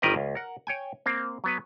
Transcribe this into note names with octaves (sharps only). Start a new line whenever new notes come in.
G1 D#3 G3 A#4 B4 D#5
C#2
A#4 F#5
C#5 G5 G#5
A#3 C4
F#3 B3 B4